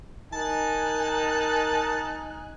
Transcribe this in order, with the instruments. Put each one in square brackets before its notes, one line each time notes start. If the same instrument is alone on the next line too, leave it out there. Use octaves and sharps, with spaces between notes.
[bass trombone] D#4 [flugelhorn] A#4 [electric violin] G#5 F#6 [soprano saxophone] A5